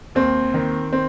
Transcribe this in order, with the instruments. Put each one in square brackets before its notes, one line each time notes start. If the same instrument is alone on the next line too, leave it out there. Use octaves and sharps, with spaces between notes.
[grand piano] D#2 C4
D#3
C4